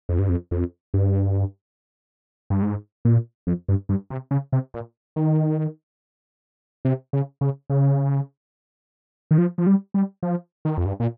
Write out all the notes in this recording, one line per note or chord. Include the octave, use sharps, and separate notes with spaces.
F2
G2
F2
F2
G2
G2
G#2
A#2
F2
G2
G2
C3
C#3
C3
A#2
D#3
C3
C#3
C#3
C#3
D#3
F3
F3
G3
G3
F3
D#3
F2
G2
A#2